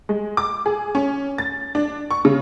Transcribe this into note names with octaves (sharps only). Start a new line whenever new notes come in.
G#3
D6
G#4
C#4
A6
D4
C#6
C#3